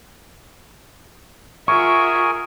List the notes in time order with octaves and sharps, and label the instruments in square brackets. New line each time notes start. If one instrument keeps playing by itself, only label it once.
[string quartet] F4 E5 F#5 [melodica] G#4 A#4 G#5 [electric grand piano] C#6